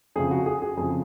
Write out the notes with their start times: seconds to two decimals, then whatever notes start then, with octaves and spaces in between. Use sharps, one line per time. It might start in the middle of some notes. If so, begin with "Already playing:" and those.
0.16 F2 C#3 G#4
0.31 F#4
0.46 G#4
0.62 G#4
0.77 F2 C#3 G#4